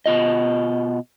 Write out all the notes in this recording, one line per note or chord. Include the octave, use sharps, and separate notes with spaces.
B2 F4 D#5